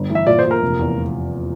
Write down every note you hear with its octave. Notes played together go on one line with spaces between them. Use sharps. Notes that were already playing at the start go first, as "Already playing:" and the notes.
Already playing: G1
E3
E5
A#2 D5
C5
A#2
A#4
F1
E2